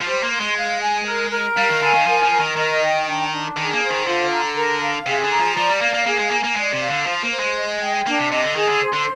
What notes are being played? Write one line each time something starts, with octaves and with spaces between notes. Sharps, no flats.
F3
G3 C5
A#3
C6
G#3
F5
G#5
A#4
A#4
G3 F5
D#3
D3 G#5
D#3
F3 A#4
F3
A#4
D#3
D#3 D#5
G5
D4
D4
D#3 G#4
A#3
C5
D#3
D3 F4
A#5
A#4
F5
C3 G#4
D3
A#5
F3
F3 D5
G3
A#3 F5
A#3
A#3 G#4
G#3
A#3 G#5
A#3
G#3 D5
C3
F5
D3
F3 C5
A#3
C5
G#3
D#5
G5
A#3 D4
C3
C3 D#5
D3
D#3 G#4
D3
C5
D3